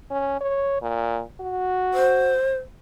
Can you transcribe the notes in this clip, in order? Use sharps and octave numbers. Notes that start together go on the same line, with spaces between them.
C#4
C#5
A#2
F#4
C5